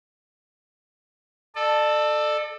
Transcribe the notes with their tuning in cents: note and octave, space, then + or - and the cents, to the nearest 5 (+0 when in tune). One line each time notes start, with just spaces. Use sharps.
A4 +0 D5 +40